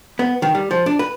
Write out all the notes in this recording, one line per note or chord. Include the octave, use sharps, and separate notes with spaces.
B3
D#3
G3
F3
D4
B4